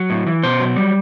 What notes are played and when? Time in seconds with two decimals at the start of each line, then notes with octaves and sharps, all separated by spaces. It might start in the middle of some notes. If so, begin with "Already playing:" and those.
Already playing: F#3
0.10 A2
0.27 E3
0.43 B2 C5
0.60 F#3
0.76 G3